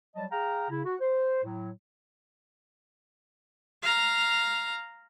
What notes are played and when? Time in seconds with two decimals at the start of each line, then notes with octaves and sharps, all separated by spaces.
0.16 F#3 G3 D#5 A5
0.31 G#4 F5 G5 A#5
0.70 C#3 E4
0.85 F#4
1.00 C5
1.44 A2 F#3
3.82 F5 A#5